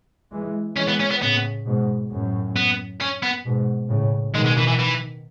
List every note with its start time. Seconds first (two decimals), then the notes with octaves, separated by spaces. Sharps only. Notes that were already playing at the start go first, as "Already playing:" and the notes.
0.32 E3 G#3
0.76 E3 G#3 C#4
0.88 B3
1.00 C#4
1.10 B3
1.21 A2 C#3 B3
1.66 G#2 B2
2.11 F#2 A2
2.56 B3
3.00 C#4
3.23 B3
3.45 G#2 B2
3.90 A2 C#3
4.34 B2 D#3 G#3
4.46 G#3
4.57 E3
4.68 E3
4.79 E3